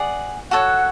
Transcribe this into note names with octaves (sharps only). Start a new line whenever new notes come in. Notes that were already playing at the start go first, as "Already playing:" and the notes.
Already playing: G#4 D5 F#5
F#4 A4 C#5 F#5